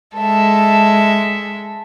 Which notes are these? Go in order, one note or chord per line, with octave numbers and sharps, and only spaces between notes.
G#3 A4 E5